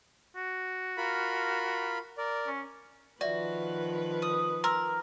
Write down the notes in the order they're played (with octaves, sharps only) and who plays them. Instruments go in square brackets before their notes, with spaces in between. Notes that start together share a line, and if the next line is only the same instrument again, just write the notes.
[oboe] F#4
[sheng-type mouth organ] F4 A#4 B5
A#4 D5
[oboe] C#4
[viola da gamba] D#3 F3 B4 [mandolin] F#4 [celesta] D5 E5
[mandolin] D#6
[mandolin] A#4 [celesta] C6 E6